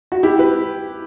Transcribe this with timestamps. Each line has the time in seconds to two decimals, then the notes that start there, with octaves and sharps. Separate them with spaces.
0.12 F#4
0.23 E4 G4
0.39 B4